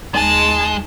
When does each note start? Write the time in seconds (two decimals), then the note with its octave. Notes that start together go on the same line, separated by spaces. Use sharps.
0.15 D#2 G#3 A5